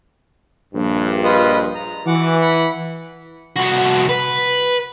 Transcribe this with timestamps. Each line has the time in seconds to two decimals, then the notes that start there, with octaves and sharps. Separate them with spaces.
0.74 A#1 G2
1.24 F4 B4 D#5
1.75 A#5
2.07 E3 F#4 F#5 D6
2.41 F#5 B5
3.56 C2 F#4
4.09 B4